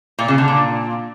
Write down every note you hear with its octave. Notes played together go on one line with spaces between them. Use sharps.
A#2
C#3
D3
A#2